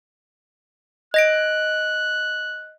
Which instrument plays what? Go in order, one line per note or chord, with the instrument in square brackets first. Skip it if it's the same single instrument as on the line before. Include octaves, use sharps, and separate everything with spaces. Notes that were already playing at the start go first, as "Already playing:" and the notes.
[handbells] D#5 A#6 D7 [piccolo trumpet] F#6